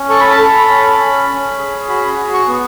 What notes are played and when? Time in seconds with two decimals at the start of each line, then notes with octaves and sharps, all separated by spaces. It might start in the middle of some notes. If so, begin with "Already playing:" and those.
Already playing: C#4
0.09 A4 C#6
0.20 B5
0.30 A5
0.39 A4 B5
0.69 C#4
0.99 C#4
1.29 C#4
1.59 G#4
1.88 F#4 B5
2.18 F#4
2.34 C#6
2.48 B3